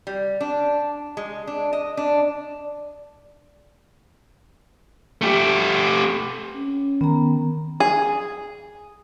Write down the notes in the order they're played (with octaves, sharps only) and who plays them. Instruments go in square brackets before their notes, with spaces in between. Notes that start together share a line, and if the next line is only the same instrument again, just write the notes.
[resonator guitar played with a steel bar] G3
D4
G#3
D4
D#5
D4
[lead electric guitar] A3 G4
[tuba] C#4
[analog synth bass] D#3 [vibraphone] B3 A#5
[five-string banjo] G#4